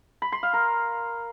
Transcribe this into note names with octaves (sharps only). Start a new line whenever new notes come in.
B5
C6
F5
A#4